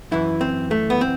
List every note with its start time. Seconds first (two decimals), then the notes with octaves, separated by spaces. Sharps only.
0.11 F#2 E3 E4
0.41 C4
0.71 A3
0.90 B3
1.01 C4